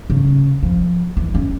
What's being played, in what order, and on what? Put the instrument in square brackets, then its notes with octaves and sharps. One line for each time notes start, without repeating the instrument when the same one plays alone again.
[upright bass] C#3
F3
E3
C#4